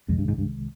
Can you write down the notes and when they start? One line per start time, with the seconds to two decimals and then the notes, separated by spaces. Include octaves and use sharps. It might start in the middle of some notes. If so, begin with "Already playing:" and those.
0.09 C2 F2 C3 D#3 G#3
0.18 G2
0.28 G#2
0.38 G2